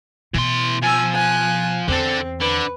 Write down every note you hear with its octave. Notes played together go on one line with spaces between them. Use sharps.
B2 E3 C6
F3 G#5 E6
G#5 F#6
E2 D3 C4 A4
D3 B4